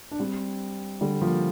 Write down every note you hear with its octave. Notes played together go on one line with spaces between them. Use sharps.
D4
G3 C4
D3 G3
F3 A#3